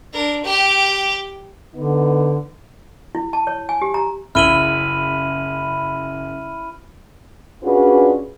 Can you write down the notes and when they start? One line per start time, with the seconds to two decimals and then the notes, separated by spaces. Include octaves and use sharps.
0.13 D4 A#4
0.44 G4 G5
1.75 D3 B3 D#4
3.15 E4
3.33 A5
3.47 C#5
3.69 G#5
3.82 G4
3.94 A#5
4.35 F#1 C#3 E4 F6 D#7 F#7 G7
7.63 C#4 D4 F4 F#4 G#4 B4